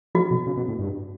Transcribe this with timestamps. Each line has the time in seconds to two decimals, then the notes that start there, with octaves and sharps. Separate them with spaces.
0.15 F3 F#4
0.31 B2
0.47 C#3
0.57 B2
0.68 A2
0.79 G2